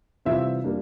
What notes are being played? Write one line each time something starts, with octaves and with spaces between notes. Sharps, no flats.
C3 E3 G3 C4 F4 E5
G3 A#3 D4